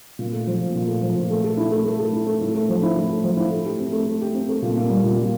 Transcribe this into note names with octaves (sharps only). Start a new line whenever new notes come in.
A#2
A3
F3
A#2
A#2
A3
F3
A#2
A3
A4
E4
A3
A3
A4
E4
A3
A2
A3
F3
E4
A2
A3
F3
E4
A3
G4
C4
A3
A3
G4
C4
A3
A#2
A#3
G3
A#2
A#2